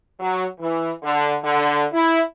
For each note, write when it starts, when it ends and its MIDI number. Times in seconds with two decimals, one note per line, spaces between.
0.20 0.45 54
0.60 0.91 52
1.03 1.35 50
1.44 1.85 50
1.93 2.22 64